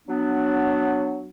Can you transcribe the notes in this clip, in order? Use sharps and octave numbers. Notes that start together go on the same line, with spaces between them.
F#3 B3 D4